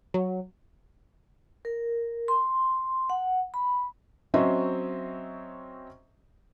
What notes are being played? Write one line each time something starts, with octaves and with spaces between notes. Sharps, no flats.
F#3
A#4
C6
F#5
B5
F#3 C4 C#4 C5 D#5 E5